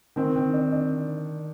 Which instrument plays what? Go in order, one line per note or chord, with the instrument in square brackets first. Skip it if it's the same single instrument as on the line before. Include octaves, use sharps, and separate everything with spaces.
[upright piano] D#3 [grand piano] C4
[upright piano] D#3
D4
D4